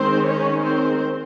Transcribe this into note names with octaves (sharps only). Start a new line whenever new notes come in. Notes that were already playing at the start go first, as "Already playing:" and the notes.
Already playing: D#3 G#3 C4 C5
C#4 C#5
C4 C5